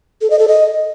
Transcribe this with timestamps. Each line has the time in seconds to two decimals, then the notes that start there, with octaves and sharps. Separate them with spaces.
0.21 A4
0.30 D#5
0.39 A4
0.48 D#5